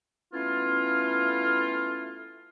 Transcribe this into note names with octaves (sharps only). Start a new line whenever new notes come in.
A3 B3 C#4 E4 F4